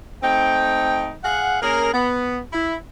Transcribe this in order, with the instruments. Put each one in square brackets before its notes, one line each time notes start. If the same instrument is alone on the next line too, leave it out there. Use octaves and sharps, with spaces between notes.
[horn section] A3 C4 D#4 G5
G#4 F5 F#5
A#3 C#4 G#4 A#4
B3
E4